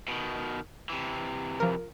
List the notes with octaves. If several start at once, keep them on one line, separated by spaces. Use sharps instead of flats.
B2 D#3
C3 E3
F3 A#4